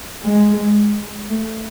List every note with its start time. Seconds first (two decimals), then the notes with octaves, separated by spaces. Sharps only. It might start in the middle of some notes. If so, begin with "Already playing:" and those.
0.24 G#3
1.28 A3